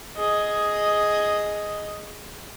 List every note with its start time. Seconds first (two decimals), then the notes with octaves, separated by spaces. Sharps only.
0.17 G#4 D#5